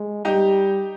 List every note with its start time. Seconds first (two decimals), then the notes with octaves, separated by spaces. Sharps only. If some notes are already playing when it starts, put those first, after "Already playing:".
Already playing: G#3
0.25 G3 D#4 G4